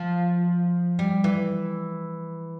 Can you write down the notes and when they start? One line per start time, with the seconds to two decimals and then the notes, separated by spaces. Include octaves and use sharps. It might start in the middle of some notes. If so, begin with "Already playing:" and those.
Already playing: F3
0.99 G3
1.24 E3